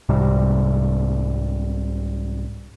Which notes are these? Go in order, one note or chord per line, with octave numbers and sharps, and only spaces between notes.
C2 G#2 C3 G3